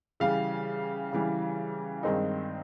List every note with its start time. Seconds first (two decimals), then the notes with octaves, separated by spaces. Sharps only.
0.20 C#3 E3 G3 F5
1.13 C#3 E3 G3
2.03 G2 D#3 G#3 C4 D#4